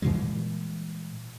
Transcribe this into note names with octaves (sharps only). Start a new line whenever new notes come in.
A#2 E3 G3 G#3